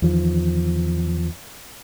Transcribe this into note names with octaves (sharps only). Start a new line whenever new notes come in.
E2 D#3 F3